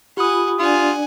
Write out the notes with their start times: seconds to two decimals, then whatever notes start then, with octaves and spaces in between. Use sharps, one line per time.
0.17 F4 G4 F#5 G#5 B5 D#6
0.60 D4 F4 D5 F#5 G#5